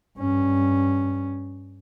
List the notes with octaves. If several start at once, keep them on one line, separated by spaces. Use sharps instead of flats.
G2 C#4